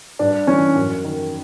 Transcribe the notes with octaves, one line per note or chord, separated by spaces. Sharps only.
G2 D4
E3 C#4
F#2
D#3